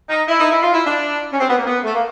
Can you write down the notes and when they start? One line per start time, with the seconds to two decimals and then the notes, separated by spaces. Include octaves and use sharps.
0.09 D#4
0.28 E4
0.40 D#4
0.51 E4
0.62 F4
0.74 E4
0.86 D4
1.32 C#4
1.40 C4
1.49 B3
1.58 A#3
1.66 B3
1.84 A3
1.94 A#3